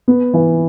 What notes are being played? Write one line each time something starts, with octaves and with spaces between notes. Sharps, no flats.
B3
E3